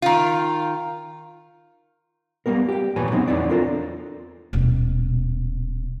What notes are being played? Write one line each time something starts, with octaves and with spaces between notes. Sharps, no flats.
D#3 F4
G3 A#3 B3 A#4
G4 G5
D#2 A#2 E3 B4 C#5 G#5
D3 E3 F#3 B3 C4 D#4
E2 D#4 E4 C#5 D5
C4 D4 F4 A4 A#4 C5
D#1 B2